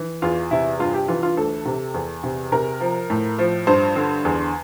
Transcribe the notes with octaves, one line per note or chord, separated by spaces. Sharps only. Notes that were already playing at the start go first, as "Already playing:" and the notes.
Already playing: E3
E2 F4
C3 E4
G2 F4
G4
E3 F4
F4
D2 A4
C3
E2
C3
C3 A#4
F3
A2
F3
G2 C5
D3
E2